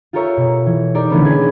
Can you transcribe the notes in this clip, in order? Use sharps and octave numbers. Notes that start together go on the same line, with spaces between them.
F4 G4 A4 A#4 C#5 E5
B2
E3
D#4 G4 A#4 D5
D3 E3 A3 B3 C#4 B4
G#4 D#5 G#5